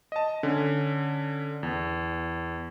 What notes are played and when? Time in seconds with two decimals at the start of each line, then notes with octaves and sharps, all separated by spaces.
0.12 D#5 A5
0.43 D3 C#4
1.63 E2